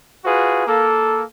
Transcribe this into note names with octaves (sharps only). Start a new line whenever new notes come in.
F4 F#4 G#4 B4
A#3 A4